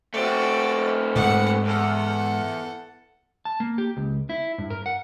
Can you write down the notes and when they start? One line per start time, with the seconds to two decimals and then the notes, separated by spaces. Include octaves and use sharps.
0.14 A3 C4 F#4 D5
1.16 G#2 F#5
1.65 E2 A4 F#5
3.45 A5
3.60 A#3
3.78 G4
3.97 C#2
4.29 E4
4.58 G2
4.70 A#4
4.86 F#5